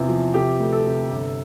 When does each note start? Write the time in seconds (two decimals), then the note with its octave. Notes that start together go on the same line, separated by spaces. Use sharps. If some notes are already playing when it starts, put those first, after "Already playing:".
Already playing: E2 C3 E3 F4
0.09 F3
0.34 C3 G4
0.59 D2
0.72 A4
0.85 C3
1.10 G1